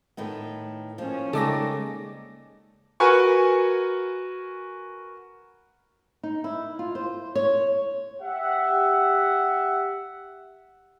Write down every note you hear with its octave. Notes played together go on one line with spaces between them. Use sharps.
A2 D#3 B3
F3 A#3 C#4
C#3 G3 G#3 D#4 A4 D6 A#6
F#4 A#4 B4 G#5 C#6
D#4
E4
F4
C5
C#5
G4 E5 F#5